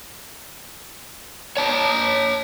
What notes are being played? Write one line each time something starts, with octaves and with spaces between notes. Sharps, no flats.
C#5 A5 A#5